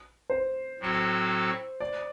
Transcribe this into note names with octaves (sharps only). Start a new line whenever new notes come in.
C5
A2 F#3 C4 F#4 A4
D5